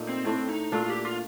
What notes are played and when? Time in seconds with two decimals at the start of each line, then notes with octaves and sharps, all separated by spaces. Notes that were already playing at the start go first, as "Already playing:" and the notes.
Already playing: A#2 A3 D#4
0.09 C4
0.25 A2 A3 C4 D4
0.49 D#4
0.72 A#2 A3 D4 F4
0.83 F4
0.89 G4
1.05 F4